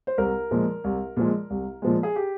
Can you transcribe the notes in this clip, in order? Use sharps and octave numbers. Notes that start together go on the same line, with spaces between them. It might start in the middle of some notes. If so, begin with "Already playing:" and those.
C5
C2 A#4
A#2 F3 G#3
C2
A#2 F3 G#3
C2
A#2 F3 G#3
G#4
G4